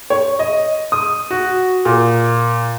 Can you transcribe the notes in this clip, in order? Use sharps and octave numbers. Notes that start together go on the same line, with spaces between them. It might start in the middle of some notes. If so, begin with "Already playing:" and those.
C#5
D#5
D#6
F#4
A#2